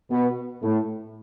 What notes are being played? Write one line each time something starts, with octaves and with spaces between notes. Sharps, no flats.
B2 B3
A2 A3